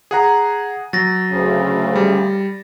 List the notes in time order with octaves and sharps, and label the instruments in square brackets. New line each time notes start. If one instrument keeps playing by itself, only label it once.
[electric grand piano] G#4 F#5 A#5
[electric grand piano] F#3 [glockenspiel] A6 A#6
[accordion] D2 C#3
[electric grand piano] G3